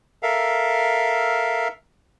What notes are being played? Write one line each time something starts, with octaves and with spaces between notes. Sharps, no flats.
A4 A#4 E5 F5